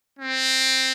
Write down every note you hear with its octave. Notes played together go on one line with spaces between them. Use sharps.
C4